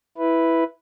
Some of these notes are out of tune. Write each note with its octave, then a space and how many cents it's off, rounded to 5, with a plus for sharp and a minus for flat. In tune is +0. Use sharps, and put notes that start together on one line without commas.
E4 +0 B4 +0